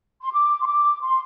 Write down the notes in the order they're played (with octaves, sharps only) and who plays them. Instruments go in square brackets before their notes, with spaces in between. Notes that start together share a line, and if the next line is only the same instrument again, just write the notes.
[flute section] C6
D6
C6
D6
C6